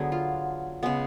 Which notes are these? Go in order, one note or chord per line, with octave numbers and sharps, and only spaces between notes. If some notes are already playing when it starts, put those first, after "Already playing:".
Already playing: D3 F#3 B3 G#4
F4
C#3 G#3 B3